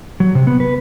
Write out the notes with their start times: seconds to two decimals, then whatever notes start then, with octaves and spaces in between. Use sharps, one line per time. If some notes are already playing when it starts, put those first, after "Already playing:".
0.20 F#3
0.35 C3
0.47 B3
0.60 B4